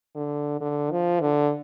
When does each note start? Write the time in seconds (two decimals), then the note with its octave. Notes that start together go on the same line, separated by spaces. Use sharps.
0.16 D3
0.61 D3
0.91 F3
1.20 D3